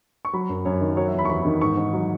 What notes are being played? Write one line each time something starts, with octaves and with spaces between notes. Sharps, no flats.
C#6
F#3 B5
F#2
F#2 C#5
D#3
F#3 C#5
E5
E2 B5
C#6
E2 B5
D#3
G#2 C#6
G#2
F#3